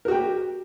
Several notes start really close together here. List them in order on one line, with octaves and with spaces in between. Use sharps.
A#4 F#4 G5 G4